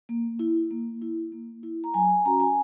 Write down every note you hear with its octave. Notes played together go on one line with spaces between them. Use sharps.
A#3
E4
A#3
E4
A#3
E4
A#5
F#3 G#5
G#5
C#4 F#4 A#5
G#5